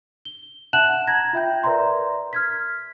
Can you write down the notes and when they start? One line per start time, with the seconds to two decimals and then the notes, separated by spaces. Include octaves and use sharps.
0.25 G7
0.73 E5 F#5 A5 F#6 E7 F#7
1.07 A#5 G#6 A#6
1.33 F4 E5 G5 G6
1.63 A#4 B4 D5 E5 A#5 C6
2.33 F6 G#6 B6